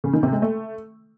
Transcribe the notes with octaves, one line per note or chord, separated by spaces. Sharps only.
C#3
D#3
C3
G#3
A3